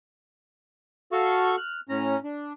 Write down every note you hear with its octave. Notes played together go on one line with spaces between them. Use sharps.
F#4 A4 F5 C#6
F6 F#6
A2 C#4 A#5
D4